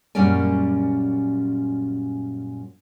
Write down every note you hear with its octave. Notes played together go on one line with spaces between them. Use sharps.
F#2 A#2 G3 C#4 D5 G#5